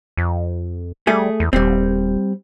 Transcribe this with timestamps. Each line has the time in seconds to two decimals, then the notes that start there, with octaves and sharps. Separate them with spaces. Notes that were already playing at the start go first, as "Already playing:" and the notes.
0.17 F2
1.07 G3 A3 G#4
1.40 E2
1.53 D#1 G3 C4